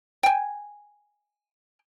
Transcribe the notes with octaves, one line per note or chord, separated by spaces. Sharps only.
G5 G#5